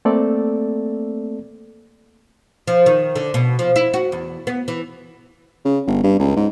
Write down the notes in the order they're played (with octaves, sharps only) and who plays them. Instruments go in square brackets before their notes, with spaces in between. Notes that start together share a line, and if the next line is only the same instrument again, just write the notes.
[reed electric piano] A3 A#3 C4 A4 D5
[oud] F3
D#3
D3
B2
F3
E4
F#4
E2
B3
E3
[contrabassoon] C#3
G1
G2
C#2
G#2